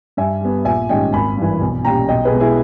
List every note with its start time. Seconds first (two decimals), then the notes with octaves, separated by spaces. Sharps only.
0.17 G2 E5 G#5
0.41 G3 B3
0.65 A#1 E5 G#5
0.89 G#2 D#3 G3 C#4 D#5 G5
1.13 G#1 G#5 B5
1.37 G2 E3
1.61 B1
1.85 A#2 G3 C#4 G5 A#5
2.08 B1 D#5 G5
2.25 G#4 B4
2.32 B2 G#3
2.40 E4 G#4